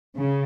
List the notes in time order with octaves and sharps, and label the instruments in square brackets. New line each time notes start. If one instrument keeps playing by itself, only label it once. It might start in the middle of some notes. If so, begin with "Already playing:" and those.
[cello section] C#3